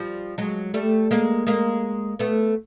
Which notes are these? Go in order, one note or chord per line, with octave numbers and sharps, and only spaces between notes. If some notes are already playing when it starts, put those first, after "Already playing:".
Already playing: F3 G3
F#3 G#3
G3 A3
G#3 A#3
G#3 A#3
A3 B3